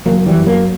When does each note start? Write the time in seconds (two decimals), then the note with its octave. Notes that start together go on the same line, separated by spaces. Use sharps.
0.06 F#1 F#3 A#3
0.19 A#3
0.26 E3 G3
0.36 F#2
0.46 F#3 A#3